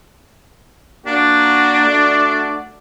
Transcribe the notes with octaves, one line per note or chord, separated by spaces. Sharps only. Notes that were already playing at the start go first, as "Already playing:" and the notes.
A#3 D4 F#4
A3 F#4 D5